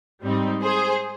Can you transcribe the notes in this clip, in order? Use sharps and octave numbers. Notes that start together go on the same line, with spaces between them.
G#2 G3 C4 D#4
G#4 C5